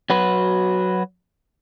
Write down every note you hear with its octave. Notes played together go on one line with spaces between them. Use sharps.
F#3 F#4 B4